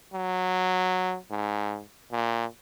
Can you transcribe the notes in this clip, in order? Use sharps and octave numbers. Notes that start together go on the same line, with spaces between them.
F#3
G#2
A#2